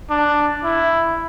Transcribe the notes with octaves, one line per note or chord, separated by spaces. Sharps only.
D4
E4